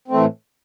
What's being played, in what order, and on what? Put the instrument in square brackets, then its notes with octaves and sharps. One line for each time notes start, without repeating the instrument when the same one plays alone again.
[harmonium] C4
A3
E3
A2